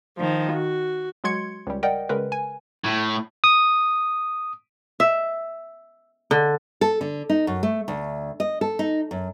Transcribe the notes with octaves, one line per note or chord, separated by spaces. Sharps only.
D#3 F3
F#4
F#3 G#3 F#4 C6 G#6 C#7
C#2 G3
A#4 D5 D#5 F#5 G5
C#3 G#3 A#4 B4
G#5
A2
D#6
E5
D3
A4
D3
D#4
F#2
A3
D2
D#5
A4
D#4
F#2